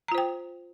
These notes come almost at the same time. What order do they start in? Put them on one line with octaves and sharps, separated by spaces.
A#5 F4 C5 G5